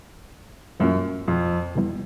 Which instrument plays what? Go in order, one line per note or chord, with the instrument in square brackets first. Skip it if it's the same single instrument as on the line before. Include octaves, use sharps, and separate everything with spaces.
[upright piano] F#2 [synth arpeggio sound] E3 G3 A#3 C#4 F4
[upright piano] F2
[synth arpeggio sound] C3 E3 G3 B3 E4